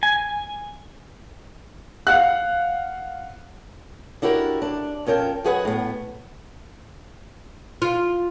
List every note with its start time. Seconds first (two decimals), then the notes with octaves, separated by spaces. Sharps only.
0.03 G#5
2.07 F5 F#5 F#6
4.22 D4 E4 F#4 G4 A#4
4.62 D4
5.06 F2 C#4 A#4 G5 A5
5.44 F#2 F#4 G#4 B4 F#5 G#5
5.65 A2 B3
7.82 F4